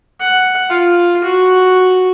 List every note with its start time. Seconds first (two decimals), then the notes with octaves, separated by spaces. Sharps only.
0.20 F#5
0.70 F4
1.24 F#4